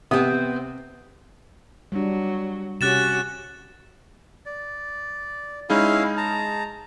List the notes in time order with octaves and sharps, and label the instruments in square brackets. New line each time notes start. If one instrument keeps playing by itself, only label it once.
[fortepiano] C3 D#6 [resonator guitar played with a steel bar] B3 C4
[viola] F#3 [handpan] G3 D4
[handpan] C3 C#4 [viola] F#4 G4 [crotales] F#6 A6 E7
[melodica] D5
[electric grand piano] G#3 D#4 G#4 [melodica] C#4 E4 F5
[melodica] A5 A#5